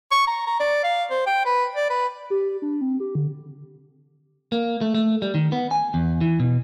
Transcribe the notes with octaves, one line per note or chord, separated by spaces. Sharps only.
C#6
A#5
A#5
D5
F5
C5
G5
B4
D5
B4
G4
D4
C4
G4
D3
A#3
A3
A3
G3
D#3
B3
G#5
E2
E3
B2